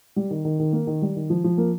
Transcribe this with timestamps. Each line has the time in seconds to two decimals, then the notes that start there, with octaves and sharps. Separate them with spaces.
0.16 G3
0.30 D#3
0.45 D#3
0.59 D#3
0.73 A#3
0.87 D#3
1.02 G3
1.16 D#3
1.30 F3
1.44 F3
1.58 A#3